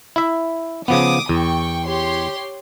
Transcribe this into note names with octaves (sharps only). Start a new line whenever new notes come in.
E4 E5
C#3 F3 B3 D6 D#6
E2 G5 C#6
G4 C#5 C6